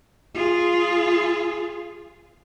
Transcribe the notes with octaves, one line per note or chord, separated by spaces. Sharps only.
F4 G#4